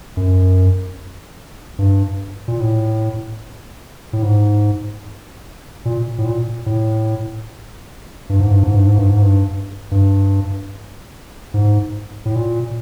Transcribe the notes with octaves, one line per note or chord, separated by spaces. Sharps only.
F#2
G2
A#2
A2
A2
G#2
A#2
A2
A#2
A2
G2
G#2
G2
G#2
G2
G#2
G2
G#2
G2
G2
G#2
A2
A#2